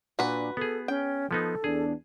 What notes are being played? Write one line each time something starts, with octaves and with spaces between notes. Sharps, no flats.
A#2 D4 F#4 B4
B3 G#4 A4
C#4 G5
F3 B3 D#4 A4
E2 B3 D4 G#4